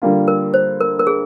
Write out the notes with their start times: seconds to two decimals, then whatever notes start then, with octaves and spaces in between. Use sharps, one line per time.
0.02 D3 G3 A#3 F4
0.28 A#4
0.54 C5
0.81 A#4
0.99 A#4
1.07 G#4